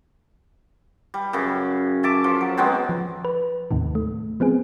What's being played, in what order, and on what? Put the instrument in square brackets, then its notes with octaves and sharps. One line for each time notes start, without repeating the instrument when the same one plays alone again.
[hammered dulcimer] G3
F#2 C#3
E5 A5 D6
F3
F#3
F#3 G#3 B3 C4
[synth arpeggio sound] F3
B4
D#2 A2 C3 D#3
A3
F3 B3 C4 G#4